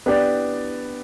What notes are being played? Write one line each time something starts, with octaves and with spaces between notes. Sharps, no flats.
B3 D4 G4 D5